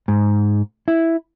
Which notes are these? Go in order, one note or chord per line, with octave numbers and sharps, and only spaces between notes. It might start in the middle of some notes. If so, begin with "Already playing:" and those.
G#2
E4